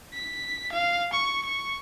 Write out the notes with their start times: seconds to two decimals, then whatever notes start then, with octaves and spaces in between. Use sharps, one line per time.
0.14 B6
0.72 F5
1.13 C#6
1.45 C#6